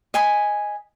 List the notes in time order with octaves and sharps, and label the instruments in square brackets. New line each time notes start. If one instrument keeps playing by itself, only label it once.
[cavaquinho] D#5 G#5 B5